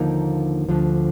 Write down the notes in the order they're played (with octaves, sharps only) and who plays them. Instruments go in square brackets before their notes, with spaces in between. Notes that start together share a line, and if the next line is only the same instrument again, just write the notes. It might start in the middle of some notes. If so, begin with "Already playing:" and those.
Already playing: [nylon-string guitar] D#2 D3 F3 A#3 D#4
D2 D3 F3